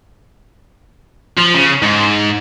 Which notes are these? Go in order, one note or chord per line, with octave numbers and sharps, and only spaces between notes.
F3
C#3
G#2